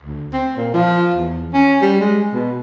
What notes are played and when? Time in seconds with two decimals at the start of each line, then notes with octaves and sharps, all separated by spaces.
0.03 D2
0.33 C4
0.57 A#2
0.74 F3
1.14 E2
1.53 C#4
1.81 G3
2.01 G#3
2.33 B2